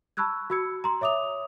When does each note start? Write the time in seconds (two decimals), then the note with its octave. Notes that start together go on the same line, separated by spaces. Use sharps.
0.17 A5 B5 C#6 E6 F#6 G#6
0.50 F#4 B5 E6 G#6 C#7
0.84 A#5 C6
1.01 C#5 E5 D6 D#6 F7